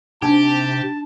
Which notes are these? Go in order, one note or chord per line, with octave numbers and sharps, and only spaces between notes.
C3 D4 D#4 G4 A5